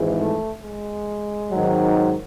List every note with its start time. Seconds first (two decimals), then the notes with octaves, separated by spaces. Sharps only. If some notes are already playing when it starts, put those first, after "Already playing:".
Already playing: G#1 G#2 E3
0.18 A3
0.62 G#3
1.51 G#1 G#2 D#3 F#3